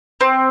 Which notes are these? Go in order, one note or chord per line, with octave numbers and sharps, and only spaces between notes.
C4